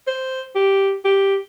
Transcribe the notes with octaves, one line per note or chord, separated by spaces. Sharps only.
C5
G4
G4